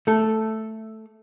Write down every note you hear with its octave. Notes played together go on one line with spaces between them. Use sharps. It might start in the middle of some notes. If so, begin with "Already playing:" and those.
A3 A4